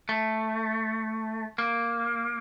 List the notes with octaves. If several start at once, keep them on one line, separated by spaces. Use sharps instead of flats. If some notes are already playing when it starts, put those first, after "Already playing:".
A3
A#3